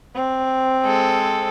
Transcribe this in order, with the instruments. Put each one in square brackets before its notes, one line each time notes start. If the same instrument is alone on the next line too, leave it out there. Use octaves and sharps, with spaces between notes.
[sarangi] C4
[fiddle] G#3 A4